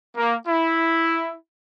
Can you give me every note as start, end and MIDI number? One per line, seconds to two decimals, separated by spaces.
0.16 0.35 58
0.47 1.35 64